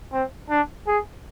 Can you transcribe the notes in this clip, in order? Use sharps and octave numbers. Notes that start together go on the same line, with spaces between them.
C4
D4
G#4